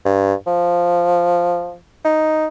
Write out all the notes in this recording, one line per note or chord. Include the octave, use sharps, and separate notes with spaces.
G2
F3
D#4